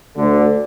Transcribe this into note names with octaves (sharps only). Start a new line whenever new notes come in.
D2 D3